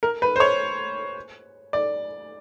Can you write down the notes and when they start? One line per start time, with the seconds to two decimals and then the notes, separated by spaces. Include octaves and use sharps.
0.03 A#4
0.22 B4
0.36 C5
0.40 C#5
1.73 D5